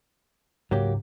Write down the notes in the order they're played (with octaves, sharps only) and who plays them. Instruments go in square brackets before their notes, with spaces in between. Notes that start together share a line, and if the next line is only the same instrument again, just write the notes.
[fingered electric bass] G#2 C#3 [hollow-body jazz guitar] F#3 A#3 G4